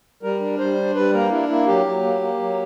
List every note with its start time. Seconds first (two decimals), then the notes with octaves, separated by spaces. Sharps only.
0.23 G3 A#4
0.40 D4
0.59 G3 C5
0.77 D4
0.95 G3 B4
1.13 A#3 A#4
1.30 D4 E4
1.48 A#3 E4
1.67 F#3 G4
1.86 F#3
2.03 A#3
2.21 A#3
2.39 F#3